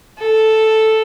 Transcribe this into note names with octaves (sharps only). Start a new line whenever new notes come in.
A4